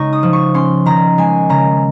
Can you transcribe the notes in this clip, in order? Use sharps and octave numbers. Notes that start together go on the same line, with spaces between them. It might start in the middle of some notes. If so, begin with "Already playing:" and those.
Already playing: C#3 G#3 D#4 C#6
D#6
F3
C#6
C#4 C6
D#3 A#5
G#3 G#5
C#3 A#5